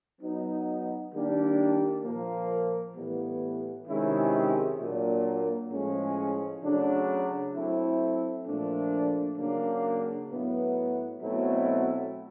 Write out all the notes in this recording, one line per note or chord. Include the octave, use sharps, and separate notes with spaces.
F#3 B3 D#4
D#3 G3 A#3 D4
A#2 F3 A#3
A2 E3 G3 B3
C3 D#3 G#3 C#4 E4
A#2 F#3 A#3 D4
A2 F3 G#3 C#4
C#3 F#3 A3 D4
F#3 A3 C4 E4
A#2 F3 A3 D4
C#3 F#3 A#3 D4
A2 F#3 B3 E4
B2 F#3 A3 C4 E4